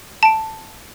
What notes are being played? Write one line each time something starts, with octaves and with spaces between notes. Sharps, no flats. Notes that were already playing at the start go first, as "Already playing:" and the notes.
A5 D7